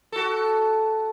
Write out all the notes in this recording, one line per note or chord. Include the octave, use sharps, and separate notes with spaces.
F#4 A4